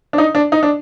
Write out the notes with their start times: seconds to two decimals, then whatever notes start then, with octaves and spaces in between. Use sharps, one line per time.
0.13 D4
0.18 D#4
0.35 D4
0.52 D#4
0.63 D4